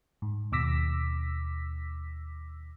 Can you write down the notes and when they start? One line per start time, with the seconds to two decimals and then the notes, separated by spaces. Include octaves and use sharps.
0.22 G#2
0.52 D#2 B2 D6 E6 A#6 B6